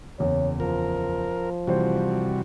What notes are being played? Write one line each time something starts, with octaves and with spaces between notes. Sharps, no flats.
F#1 E2 C#5
F3 A#4
C3 E3 G3 F#4 C5